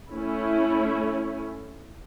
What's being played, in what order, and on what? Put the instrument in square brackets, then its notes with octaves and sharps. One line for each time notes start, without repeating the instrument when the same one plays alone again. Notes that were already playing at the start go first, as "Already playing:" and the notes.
[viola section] A3 C#4 E4